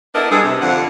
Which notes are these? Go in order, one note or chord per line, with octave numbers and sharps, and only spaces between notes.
B3 D4 E4 A4 A#4 D#5
G2 G#4 A4
C3
F2 D3 F3 F#5